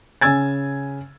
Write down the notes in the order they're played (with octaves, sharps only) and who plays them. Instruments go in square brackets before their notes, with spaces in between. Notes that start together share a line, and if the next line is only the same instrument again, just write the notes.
[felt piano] C#3 G#5 E6 G#6 A6